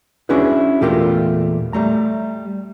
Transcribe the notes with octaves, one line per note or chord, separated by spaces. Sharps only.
C#4 D4 E4 F#4 G#4 B4
E2 A#2 A3 F4 G4 A#4
G3 A3 A#5